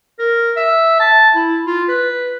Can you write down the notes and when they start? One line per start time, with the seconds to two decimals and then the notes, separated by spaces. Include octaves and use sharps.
0.19 A#4
0.57 E5
1.00 A5
1.35 E4
1.66 F4
1.89 B4